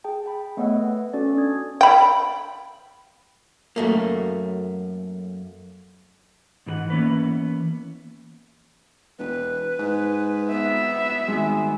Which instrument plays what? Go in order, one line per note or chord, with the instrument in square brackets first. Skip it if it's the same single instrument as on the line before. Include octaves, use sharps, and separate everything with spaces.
[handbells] G#4 G5 A5
G5 B5
A3 B3 C#5 D#5 F#5 E6
B4
C#4 F#4 A4 D5
D4 D#6 G#6
[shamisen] G5 B5
[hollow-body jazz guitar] F#2 A3 A#3
[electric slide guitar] G#2 E3 G#4 F#5
E3 A#3 B3 C#4 B4
[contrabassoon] E1 [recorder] B4
[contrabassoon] G#2
[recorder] B3 [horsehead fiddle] E5
[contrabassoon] G#1 [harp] G#3